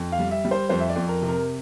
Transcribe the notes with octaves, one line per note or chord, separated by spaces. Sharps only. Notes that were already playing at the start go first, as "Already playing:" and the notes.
Already playing: F2
F5
G3
E5
G3
C5
F2 C5
E5
D5
F2
A#4
C3
A#4